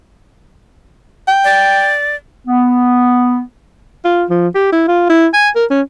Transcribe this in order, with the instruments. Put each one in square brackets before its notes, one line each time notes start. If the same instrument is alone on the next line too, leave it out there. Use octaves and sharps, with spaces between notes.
[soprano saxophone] G5
[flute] D5
[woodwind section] B3
[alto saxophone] F4
F3
G4
E4
F4
E4
G#5
A#4
C#4